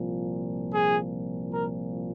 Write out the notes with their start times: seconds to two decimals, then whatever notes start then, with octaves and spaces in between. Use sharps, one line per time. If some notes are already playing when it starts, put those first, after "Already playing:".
Already playing: C2 A#2 F3
0.73 G#4
1.54 A#4